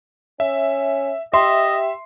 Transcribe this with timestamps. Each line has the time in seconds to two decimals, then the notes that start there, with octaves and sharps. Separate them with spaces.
0.40 C#4 E5
1.34 G4 D#5 E5 C6